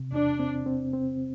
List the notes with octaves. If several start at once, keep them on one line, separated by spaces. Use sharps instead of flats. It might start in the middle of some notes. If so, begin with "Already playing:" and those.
Already playing: C3
E2 D4
C4
C4
C4